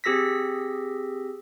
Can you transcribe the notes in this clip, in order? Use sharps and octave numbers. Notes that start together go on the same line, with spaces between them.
C4 G4 G#4 E6 A#6 B6